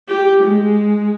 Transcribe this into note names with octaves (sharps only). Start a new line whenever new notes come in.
G4
G#3